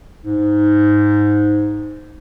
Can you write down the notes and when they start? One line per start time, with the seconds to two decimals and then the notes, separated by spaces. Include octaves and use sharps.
0.24 G#2